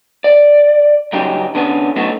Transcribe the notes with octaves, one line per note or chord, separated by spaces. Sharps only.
D5
G2 C#3 F#3 C#4 D#4 G4
D3 B3 C#4
F#3 A3 B3 C#4 D#4